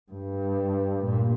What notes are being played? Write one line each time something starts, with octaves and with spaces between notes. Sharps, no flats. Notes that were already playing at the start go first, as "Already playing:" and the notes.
G2
A#2